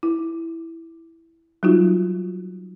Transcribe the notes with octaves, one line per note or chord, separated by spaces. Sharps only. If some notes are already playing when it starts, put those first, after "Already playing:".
E4
F#3 G3 D#4 F4 F#4